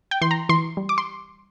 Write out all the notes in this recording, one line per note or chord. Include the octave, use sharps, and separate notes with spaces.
G5
E3 C6
A#5
E3 C6
G3
D6
C6